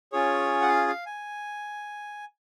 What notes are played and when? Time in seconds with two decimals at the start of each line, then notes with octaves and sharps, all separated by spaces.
0.12 C#4 F4 G#4 C#5
0.62 F#5
0.68 F5
0.87 F5
1.06 G#5